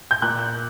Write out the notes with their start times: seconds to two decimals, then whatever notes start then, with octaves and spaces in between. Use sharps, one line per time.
0.11 G6
0.22 A#2 F#6